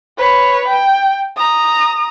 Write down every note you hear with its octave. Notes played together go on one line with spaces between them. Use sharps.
B4 C#5
G5
A#5 D#6